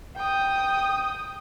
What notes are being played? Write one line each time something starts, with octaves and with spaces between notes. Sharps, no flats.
G5 D#6